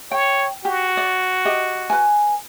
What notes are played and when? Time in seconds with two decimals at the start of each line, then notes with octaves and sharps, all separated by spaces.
0.11 C#5 G5
0.65 F#4 G4
0.97 D5
1.45 G4 D#5
1.90 B4 G#5